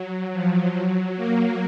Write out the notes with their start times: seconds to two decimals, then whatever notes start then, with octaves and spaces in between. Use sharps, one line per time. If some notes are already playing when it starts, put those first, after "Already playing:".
Already playing: F#3
0.33 F3
0.75 F#3
1.16 A#3